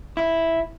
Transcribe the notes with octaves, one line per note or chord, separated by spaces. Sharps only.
E4